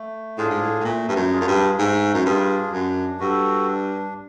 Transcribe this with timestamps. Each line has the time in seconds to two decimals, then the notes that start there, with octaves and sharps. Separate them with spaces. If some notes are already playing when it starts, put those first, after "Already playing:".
Already playing: A3
0.37 A2 D4 F4 G#4
0.50 G#2
0.62 A2
0.80 A2
0.84 A#2 A3
1.08 G2
1.16 F#2
1.32 D4 F4 G#4
1.41 F#2
1.48 G2
1.79 G#2 A3
2.14 F#2
2.26 G2 D4 F4 G#4
2.73 F#2 D4
3.20 G2 F#4 A4
3.67 D4